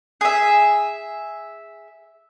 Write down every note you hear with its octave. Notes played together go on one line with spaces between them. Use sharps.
G#4 E5